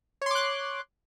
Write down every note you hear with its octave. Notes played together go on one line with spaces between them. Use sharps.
C#5 C6 D6 F#6